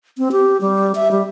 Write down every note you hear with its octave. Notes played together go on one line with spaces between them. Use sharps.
C4
G4
G3
E5
G3